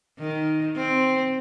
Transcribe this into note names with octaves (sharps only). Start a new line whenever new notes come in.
D#3
C4